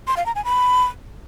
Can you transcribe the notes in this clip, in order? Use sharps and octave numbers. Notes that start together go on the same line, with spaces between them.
C6
F5
A#5
G#5
B5